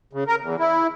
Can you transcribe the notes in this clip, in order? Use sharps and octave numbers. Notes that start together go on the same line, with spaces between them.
C#3
A#4
E2
E4